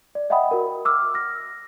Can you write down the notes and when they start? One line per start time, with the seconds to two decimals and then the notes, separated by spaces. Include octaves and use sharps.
0.15 D5
0.30 D#5 E5 F#5 G5 B5 D#6
0.51 F#4 A#4
0.85 D6 E6 F6
1.14 F6 A#6